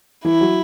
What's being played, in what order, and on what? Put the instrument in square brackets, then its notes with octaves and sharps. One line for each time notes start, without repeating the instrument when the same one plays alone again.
[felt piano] E3 [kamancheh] E4
[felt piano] F#3